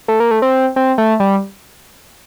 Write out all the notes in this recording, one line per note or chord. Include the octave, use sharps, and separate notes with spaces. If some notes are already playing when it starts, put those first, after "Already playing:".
A3
A#3
A3
C4
C4
A3
G3